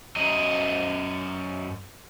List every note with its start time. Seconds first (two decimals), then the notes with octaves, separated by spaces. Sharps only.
0.16 F#2 F#3 D#5